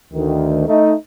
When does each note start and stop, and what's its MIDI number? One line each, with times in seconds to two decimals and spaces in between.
0.13 0.65 38
0.13 0.65 51
0.68 0.93 57
0.68 0.93 63